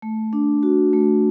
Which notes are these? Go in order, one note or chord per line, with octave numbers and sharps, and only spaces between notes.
A3
D4
F#4
A3